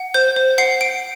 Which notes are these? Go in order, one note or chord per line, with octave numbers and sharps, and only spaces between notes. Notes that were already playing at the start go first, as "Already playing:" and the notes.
Already playing: F#5
C5 G6
C5
F#5 C7
F#5 D7